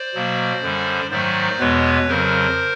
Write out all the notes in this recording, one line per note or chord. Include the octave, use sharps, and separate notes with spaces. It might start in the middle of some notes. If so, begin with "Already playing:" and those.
Already playing: C5 D5
B2 F#3 A#3
F#2 D3 G3
G#2 D#3 F#3 A3 C5 D5
E2 B2 G#3 B3 B4 C#5
F2 C#3 F#3 A#4 C5